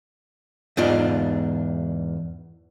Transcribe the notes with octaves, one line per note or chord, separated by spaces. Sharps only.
E2 G#2 D4 F4